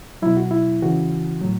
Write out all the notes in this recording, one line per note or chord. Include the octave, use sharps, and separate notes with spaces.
B2 F#3 E4
F#4
E4
C#3 E3 F#4
A2 F#3